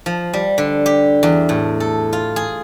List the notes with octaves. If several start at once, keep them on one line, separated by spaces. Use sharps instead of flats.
F3
G3
D3
G4
E2
A2
A4
F4
G#4